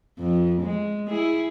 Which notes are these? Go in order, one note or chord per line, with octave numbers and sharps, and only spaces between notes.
F2
G#3
E4 G#4